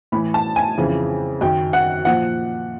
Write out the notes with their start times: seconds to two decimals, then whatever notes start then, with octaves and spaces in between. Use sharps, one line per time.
0.12 A2 E3 B5
0.34 A5
0.56 G#5
0.78 F2 C#3 E3
1.41 F#2 D#3 G5
1.73 F#5
2.05 A#2 F3 F#5